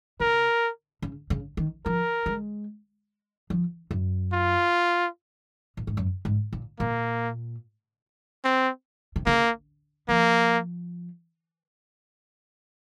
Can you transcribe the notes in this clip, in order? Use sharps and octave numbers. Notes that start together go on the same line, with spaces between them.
C3 A#4
C#3
C#3
D#3
F3 A#4
G#3
F3
F#2
F4
A#2
G#2
F#2
G#2
A#2
A#2 A#3
C4
C3
C#3 A#3
F3 A#3